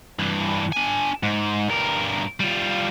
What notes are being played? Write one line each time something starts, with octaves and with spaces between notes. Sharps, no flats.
G2 E3
D4 G#5
G#2
G2 A#4
G3 F4